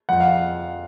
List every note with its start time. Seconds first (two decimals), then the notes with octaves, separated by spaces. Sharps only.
0.09 F2 F#5
0.20 F5